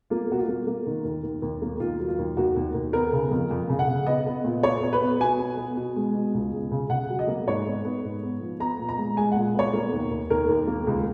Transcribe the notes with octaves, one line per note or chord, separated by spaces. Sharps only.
A#3 F4
B2 F#4
F4
A#3
A#3
D#3
D#2
D#2
D#2
A#3
D#2 F4
F#3
F4
D#2
D#2 F#4
D#2
D#2
B3 A#4
C#3
F2
F2
C#3
F#5
C#3
B3 D#5
B3
A#2
B3 C#5
B3
B4
B3
B2 G#5
B3
B3
B2
G#3
B2
C#2
C#2
C#3
C#3 F#5
F#3
D#5
A#3
G#2 C#5
B3
B3
G#2
B3
F3
B3 A#5
A#2
A#5
G#3
G#3 G#5
A#2 F#5
B3 C#5
A#3
D#2
D#2
D#2 A#4
D#2
A#3
C#2